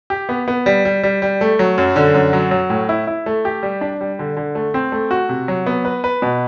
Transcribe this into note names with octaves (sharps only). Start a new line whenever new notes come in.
G4
B3
B3
G3
G3
G3
G3
A3
F#3
F#2
D3
F#2
F#3
F#3
A2
E4
E4
A3
G4
G3
D4
G3
D3
D3
A3
C4
A3
F#4
C3
F#3
B3
B4
B4
B2